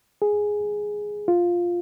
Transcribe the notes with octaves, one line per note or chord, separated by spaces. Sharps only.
G#4
F4